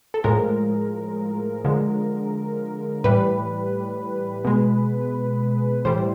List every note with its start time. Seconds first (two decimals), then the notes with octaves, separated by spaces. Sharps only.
0.14 A4
0.24 A2 F3 G#3 A#4
1.64 D3 F3 G#3
3.04 A2 E3 G3 B4
4.45 B2 G#3
5.85 A2 E3 G3 C5